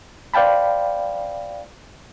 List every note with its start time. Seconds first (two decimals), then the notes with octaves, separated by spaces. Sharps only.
0.34 C5 D5 F5 G5 A5 B5